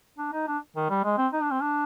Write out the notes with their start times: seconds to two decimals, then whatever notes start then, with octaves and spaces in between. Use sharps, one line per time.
0.18 D4
0.33 D#4
0.48 D4
0.76 D#3
0.90 G3
1.04 G#3
1.18 C4
1.33 D#4
1.42 D4
1.51 C4
1.61 D4